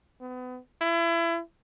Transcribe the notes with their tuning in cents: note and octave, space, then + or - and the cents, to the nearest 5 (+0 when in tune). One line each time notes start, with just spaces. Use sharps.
B3 +35
E4 +30